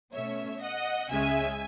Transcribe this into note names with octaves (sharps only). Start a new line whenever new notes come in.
B2 A3 C#4 C#5 E5
D#5 F#5
C#2 C#3 G#3 C#4 E5 G#5